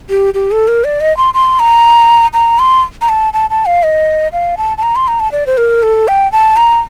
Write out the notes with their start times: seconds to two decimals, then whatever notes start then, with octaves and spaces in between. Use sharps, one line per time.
0.10 G4
0.34 G4
0.51 A4
0.68 A#4
0.84 D5
1.01 D#5
1.17 C6
1.34 C6
1.59 A#5
2.33 A#5
2.59 C6
3.01 A#5
3.09 A5
3.33 A5
3.50 A5
3.66 F5
3.83 D#5
4.33 F5
4.57 A5
4.78 A5
4.83 A#5
4.96 C6
5.08 A#5
5.20 A5
5.32 D5
5.47 C5
5.57 A#4
5.83 A4
6.08 G5
6.32 A5
6.57 A#5